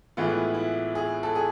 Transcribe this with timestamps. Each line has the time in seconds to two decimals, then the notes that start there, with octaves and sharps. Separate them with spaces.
0.17 A2 E3 G#3 B3 F4
0.29 E4
0.54 E4
0.95 G#4
1.23 A4
1.35 G#4